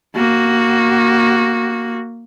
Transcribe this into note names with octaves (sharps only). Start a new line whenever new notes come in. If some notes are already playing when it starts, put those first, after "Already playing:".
A#3 F#4